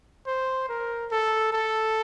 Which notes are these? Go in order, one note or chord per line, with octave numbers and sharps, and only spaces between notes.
C5
A#4
A4
A4